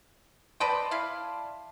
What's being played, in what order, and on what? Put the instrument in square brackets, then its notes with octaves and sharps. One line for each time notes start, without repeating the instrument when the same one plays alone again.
[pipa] B4 D#5 G5 [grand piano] D5 A5 C6
[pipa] E4 F5